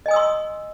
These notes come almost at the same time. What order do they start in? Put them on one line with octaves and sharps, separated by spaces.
D#5 G#5 D#6 E6 C6